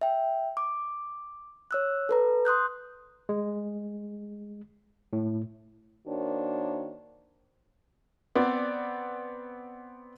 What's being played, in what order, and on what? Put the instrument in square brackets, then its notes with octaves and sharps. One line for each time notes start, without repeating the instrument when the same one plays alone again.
[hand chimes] E5 G5
D6
C#5 E6 F#6
A4 B4 A#5
C6 D#6 F#6 G6
[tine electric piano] G#3
A2
[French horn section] D#3 A#3 D4 F#4 C5 C#5
[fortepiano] B3 C4 D5